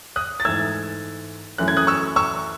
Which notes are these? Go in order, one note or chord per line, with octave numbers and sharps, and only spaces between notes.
D#6 F#6
A6
G#2 E3 A3 E6 G#6
F#2 E3 A3 C#4 F#6
G#6
D#6 F#6
C#6 E6
C#6 E6